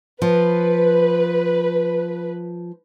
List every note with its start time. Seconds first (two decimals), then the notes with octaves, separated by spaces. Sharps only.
0.22 F3 B4